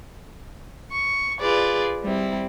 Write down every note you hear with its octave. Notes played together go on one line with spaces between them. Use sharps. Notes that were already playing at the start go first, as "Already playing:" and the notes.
C#6
F4 G#4 B4 D5
G3 C4 E4